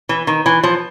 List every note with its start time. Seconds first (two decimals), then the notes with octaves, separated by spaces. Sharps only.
0.09 E3
0.27 D#3
0.46 E3
0.63 F3